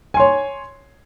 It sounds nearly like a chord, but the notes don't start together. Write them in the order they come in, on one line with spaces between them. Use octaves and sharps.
G#5 C6 C#5